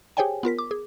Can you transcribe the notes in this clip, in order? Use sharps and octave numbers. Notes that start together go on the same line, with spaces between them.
G4 G#4 C5 C#5 G5 G#5
B3 F4 A#4 B6
D6
G#4